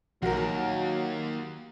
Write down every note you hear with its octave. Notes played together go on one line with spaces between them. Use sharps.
A#1 D#2 F#3 F#4 A#4